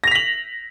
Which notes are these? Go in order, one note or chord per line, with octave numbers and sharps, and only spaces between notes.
A#6 B6 F7 F#7